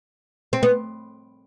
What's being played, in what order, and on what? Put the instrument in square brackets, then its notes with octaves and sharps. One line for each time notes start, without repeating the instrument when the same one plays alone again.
[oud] C4
B3